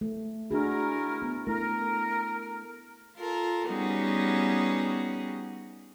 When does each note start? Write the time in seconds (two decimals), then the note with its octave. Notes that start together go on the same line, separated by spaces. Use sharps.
0.01 A3
0.51 A3 D4 E4 F#4 G#4 A#4
1.22 B3
1.47 A3 E4 A#4
3.17 F4 A4 A#4
3.67 G3 B3 C#4 D#4 F#4 G#4